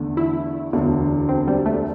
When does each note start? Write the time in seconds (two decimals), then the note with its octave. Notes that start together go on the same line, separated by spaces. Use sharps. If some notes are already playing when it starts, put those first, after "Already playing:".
Already playing: E2 D3 A3
0.17 E4
0.73 E1 D2 D3
1.29 C4
1.48 G3
1.66 A3